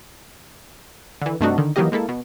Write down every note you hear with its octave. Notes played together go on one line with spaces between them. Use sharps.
D3 E3
G2 C3 A3 D4 D#4 F#4
D3 D#3
D#3 E3 F#3 A#3 G4 D#5
G#3 A#3 E4 A4
B2